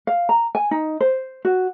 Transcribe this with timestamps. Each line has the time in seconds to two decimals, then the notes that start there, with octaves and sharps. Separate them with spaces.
0.07 F5
0.29 A#5
0.55 G#5
0.71 D#4
1.00 C5
1.45 F#4